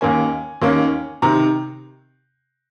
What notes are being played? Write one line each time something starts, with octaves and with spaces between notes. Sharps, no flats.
D#2 D#3 A#3 C#4 G#5
D#2 D#3 A#3 C#4
C3 D#3 A#5